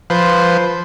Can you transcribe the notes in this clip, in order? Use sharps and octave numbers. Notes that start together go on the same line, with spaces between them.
F3 B4 C5